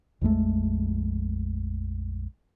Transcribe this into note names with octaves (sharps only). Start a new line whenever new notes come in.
A#1 F2 G#3 A3